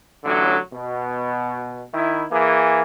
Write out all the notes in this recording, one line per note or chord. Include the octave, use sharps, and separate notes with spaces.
A1 D3 F#3
B2
D#3 E4
E3 A#3 G#4